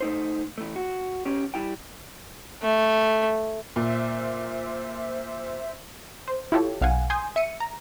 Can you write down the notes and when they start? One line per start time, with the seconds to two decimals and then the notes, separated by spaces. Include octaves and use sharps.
0.01 A3 D#4 C5
0.58 E3 A3
0.76 F#4
1.25 B1 C#4 G4
1.54 G3 E4 G5
2.62 A3
3.76 A#2 C5 E5
6.28 C5
6.52 E4 F4 G4 A4 C#5
6.81 B1 F5 F#5 G#5
7.10 G#5 C6 D#6 G6
7.36 E5 C#7 D#7
7.60 A#5